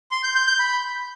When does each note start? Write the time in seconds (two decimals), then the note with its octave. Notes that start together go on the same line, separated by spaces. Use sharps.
0.11 C6
0.23 G6
0.35 G6
0.47 G6
0.59 B5